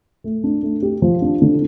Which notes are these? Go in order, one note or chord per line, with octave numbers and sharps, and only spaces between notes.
A3
D4
A3
G4
F3
D4
D3